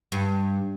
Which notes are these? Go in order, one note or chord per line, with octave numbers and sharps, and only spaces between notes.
G2